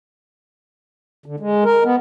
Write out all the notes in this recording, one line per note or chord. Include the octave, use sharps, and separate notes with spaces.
D3
G#3
A#4
B3